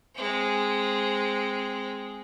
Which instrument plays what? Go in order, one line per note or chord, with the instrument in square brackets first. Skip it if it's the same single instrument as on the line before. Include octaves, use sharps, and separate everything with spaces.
[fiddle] G#3 C4